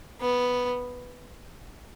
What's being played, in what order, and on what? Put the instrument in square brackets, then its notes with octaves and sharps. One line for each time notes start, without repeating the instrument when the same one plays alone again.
[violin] B3